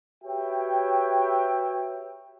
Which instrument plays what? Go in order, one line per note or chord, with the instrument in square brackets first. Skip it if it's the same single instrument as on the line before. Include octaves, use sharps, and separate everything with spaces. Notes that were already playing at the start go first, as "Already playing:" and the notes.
[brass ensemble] F#4 G4 B4 C#5 E5 G5